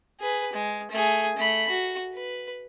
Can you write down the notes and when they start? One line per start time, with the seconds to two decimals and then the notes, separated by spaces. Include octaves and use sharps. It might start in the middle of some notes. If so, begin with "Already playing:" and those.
0.20 G#4 B4
0.53 G#3
0.91 A3 G#4
1.37 A3 B5
1.69 F#4
2.14 B4